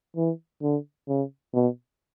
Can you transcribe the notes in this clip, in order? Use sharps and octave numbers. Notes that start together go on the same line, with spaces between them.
E3
D3
C#3
B2